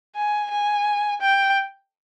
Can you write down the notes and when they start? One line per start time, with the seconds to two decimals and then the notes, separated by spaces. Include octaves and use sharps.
0.16 G#5
0.50 G#5
1.21 G5